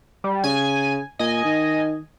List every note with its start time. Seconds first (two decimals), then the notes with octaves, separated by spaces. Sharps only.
0.24 G3
0.44 C#3 G#5
1.19 A#2 D#5 G#5
1.45 D#3